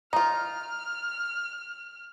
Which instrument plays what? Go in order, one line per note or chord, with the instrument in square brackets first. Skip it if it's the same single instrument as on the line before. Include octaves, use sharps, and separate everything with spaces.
[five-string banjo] D#4 F4 [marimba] A#5 [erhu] F6